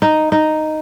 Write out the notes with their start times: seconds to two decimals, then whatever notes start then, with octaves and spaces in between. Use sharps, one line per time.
0.02 D#4
0.32 D#4